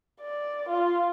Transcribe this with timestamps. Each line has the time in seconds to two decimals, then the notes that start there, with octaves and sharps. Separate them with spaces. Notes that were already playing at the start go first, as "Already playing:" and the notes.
0.21 D5
0.68 F4